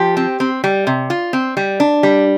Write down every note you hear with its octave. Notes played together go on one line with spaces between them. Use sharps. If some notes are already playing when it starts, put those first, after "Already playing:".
Already playing: F3 G4
C4
C4
G3
C3
F4
C4
G3
D4
G3